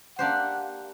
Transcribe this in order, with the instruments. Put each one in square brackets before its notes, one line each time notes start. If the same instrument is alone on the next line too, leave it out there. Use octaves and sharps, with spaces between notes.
[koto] A#3 D4 G4 C5 [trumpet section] F#5